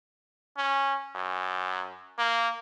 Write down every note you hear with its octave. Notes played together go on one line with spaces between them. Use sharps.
C#4
F#2
A#3